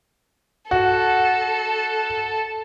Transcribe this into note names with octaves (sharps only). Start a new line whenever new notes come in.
F#4 A4